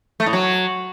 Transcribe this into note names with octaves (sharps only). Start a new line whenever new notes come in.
A3
A2
F#3